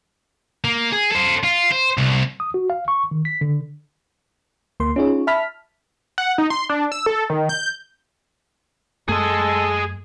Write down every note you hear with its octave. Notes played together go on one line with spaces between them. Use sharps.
A#3
G#4
A4 C5
F4
C5
C2
D#6
F#4
F5
C#6
D#3
B6
D3
D2 A#3 C6
C#4 D#4 F4 G#4 C#5
E5 A5 B5 F6 B6
F#5
D#4
C6
D4
E6
A4
D#3
G6
F#2 A3 G#4 A4 D#5